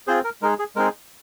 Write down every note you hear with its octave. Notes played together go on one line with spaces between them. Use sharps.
C4 F4 G#4 C5
A#4
G#3 D#4 G#4 A#4
G#4
G#3 C4 D#4 G#4 A#4